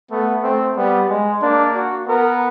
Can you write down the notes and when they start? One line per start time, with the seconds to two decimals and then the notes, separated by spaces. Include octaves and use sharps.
0.11 A3 B3
0.43 A3 C4
0.76 G3 B3
1.09 G#3
1.42 A#3 D4
1.75 F#4
2.07 B3 A#4